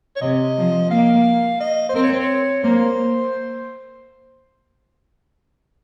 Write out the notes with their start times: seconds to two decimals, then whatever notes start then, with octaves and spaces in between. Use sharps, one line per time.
0.16 C#5
0.21 C3 D#5
0.57 F3
0.90 A#3 F5
1.61 D#5
1.89 C5
1.95 C4 A#4
2.03 C#5
2.13 C5
2.20 C#5
2.64 A#3 C5